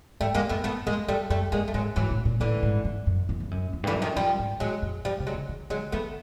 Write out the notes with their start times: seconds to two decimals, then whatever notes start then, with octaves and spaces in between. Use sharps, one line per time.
0.20 G#2 G3 A3
0.34 G2 G#3 A#3
0.49 F#2 A3 B3
0.64 G2 A3 B3
0.87 F#2 G#3 A#3
1.08 F2 G3 A3
1.30 F#2 G3 A3
1.52 G2 G#3 A#3
1.68 A3
1.74 G#2 F#3 G#3
1.96 G#2 E3 F#3
2.11 A2
2.25 A#2
2.40 A2 D3 E3
2.63 G#2
2.85 G2
3.07 F#2
3.29 F#2
3.40 G2
3.51 F#2
3.73 F2
3.84 G2 D3 E3
3.95 F#2
4.02 D#3 F3
4.16 F2 F3 G3
4.39 G#2
4.60 A2 F#3 G#3
4.82 F2
5.05 A#2 F3 G3
5.20 C3
5.27 F#3 G#3
5.35 C#3
5.49 D#3
5.70 D3 F#3 G#3
5.92 D#3 A3 B3